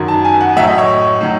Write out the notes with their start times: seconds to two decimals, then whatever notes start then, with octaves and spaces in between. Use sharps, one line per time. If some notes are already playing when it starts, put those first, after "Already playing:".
Already playing: F#2 D#3 F#3
0.08 A5
0.24 G#5
0.41 F#5
0.56 A2 F#3 E5
0.67 D#5
0.78 C#5
1.21 A2 F#3